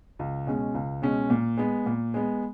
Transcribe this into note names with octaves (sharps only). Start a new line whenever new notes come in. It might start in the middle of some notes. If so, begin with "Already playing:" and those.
C#2
B2 G#3 C#4
C#2
B2 G#3 C#4
A#2
G#3 B3
A#2
G#3 B3